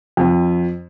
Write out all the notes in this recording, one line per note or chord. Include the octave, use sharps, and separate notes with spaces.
F2